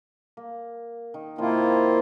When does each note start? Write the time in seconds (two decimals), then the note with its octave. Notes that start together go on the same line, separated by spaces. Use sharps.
0.37 A#3
1.14 D#3
1.38 C3 D#3 F3 A#3 E4 F4